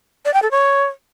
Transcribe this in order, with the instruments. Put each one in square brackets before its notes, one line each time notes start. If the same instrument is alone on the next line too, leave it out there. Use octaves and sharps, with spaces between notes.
[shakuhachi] D5
G5
A4
C#5